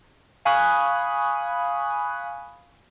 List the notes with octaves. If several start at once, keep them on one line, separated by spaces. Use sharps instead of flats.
F5 G#5 B5 C#6 D#6 F#6